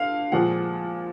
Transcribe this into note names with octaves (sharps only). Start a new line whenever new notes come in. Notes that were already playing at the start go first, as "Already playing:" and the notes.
Already playing: D3 F5
A#2 F3 G#3 F#5